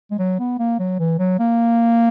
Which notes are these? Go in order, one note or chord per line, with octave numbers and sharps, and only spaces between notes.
G#3
F#3
B3
A#3
F#3
E3
F#3
A#3